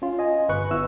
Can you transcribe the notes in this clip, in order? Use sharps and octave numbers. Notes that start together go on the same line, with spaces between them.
C#4 F4
D#5 G#5
G1 B4 C#6 F#6
B3 E4 E6